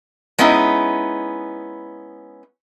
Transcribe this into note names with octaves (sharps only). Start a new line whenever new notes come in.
G#3 B3 C#4 D#4 E4